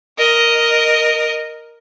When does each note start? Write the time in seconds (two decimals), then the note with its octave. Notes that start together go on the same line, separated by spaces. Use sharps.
0.18 A#4 D#5